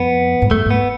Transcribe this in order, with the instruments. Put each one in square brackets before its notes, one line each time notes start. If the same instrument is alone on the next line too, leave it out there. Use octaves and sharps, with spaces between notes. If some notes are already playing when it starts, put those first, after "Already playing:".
Already playing: [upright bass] F2 [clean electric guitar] B3
[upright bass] G#2
[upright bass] F#2 [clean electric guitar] A3
[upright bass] G#2 [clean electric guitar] B3